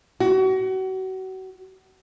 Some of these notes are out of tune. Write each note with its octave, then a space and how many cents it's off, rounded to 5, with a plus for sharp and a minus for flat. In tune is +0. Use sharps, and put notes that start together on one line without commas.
F#4 +30